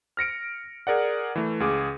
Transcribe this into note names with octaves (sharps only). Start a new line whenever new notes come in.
F6 A#6 C#7 D7
G#4 A#4 D5 F#5
E3 A3
C#2 G#4 D6